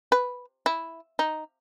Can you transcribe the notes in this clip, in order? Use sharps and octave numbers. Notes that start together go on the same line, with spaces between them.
B4
E4
D#4